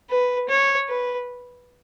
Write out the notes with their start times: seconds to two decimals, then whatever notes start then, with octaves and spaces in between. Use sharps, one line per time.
0.10 B4
0.49 C#5
0.89 B4